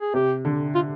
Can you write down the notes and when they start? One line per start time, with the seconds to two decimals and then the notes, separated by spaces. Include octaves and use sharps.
0.01 G#4
0.14 C3 G4
0.45 D3
0.75 F4